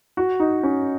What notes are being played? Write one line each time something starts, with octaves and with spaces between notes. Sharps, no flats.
F#4
D#4
C#4